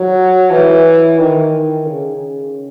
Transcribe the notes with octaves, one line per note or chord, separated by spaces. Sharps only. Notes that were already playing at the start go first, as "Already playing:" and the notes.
Already playing: F#3
E3
D#3
C#3